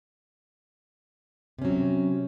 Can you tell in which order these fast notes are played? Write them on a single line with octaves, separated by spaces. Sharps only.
C3 C#4 F#3